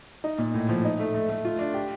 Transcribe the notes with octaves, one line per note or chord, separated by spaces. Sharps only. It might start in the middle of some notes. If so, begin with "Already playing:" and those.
D#4
A#2
A2
F3
D#4
A3
A3
A3
F4
D4
G4